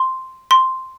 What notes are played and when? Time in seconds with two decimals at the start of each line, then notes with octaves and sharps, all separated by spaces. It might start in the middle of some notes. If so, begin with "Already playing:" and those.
Already playing: C6
0.51 C6